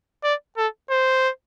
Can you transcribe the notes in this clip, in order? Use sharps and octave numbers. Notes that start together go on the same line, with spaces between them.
D5
A4
C5